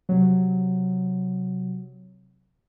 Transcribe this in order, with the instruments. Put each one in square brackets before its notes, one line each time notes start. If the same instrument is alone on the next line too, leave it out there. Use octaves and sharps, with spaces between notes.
[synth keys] C3 F#3